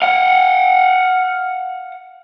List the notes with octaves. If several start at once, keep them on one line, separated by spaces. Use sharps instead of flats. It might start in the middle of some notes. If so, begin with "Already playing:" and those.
F5 F#5